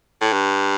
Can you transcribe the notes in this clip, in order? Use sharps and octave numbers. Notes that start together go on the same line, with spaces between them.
A2
G2